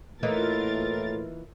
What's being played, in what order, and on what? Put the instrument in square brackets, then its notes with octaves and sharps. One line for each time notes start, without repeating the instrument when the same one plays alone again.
[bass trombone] A2 [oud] E3 A#3 D#4 [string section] F4 A#4 A6